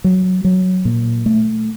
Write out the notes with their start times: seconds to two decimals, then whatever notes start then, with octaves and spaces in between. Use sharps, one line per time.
0.04 F#3
0.44 F#3
0.85 A#2
1.26 A3